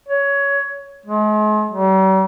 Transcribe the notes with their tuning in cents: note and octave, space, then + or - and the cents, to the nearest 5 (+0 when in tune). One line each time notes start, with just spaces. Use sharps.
C#5 +15
G#3 +40
G3 -45